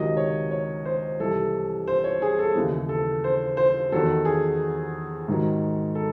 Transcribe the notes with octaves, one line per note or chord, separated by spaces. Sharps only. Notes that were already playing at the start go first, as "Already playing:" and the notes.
Already playing: C#2 C3 D#3 F#3 D#5
C#5
C#5
C5
C2 C3 E3 A4
C5
C#5
G#4
A4
D#2 C#3 E3
A4
C5
C5
E2 D#3 F#3 A4
G#4
G#2 D#3 F#3
A4